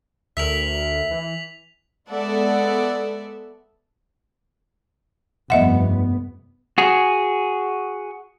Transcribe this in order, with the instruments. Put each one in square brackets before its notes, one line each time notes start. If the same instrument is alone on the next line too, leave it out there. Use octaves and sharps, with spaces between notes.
[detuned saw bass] D2 [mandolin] A#4 E5 [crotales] B6 F7 F#7
[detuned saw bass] E3
[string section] G#3 B3 A4 D5 E5 F#5
[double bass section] F1 G2 B3 [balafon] D#5 E5 F#5
[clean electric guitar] F#4 G#4